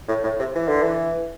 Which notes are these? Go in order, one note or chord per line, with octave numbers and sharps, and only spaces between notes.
A2
A2
C3
E3
D3
E3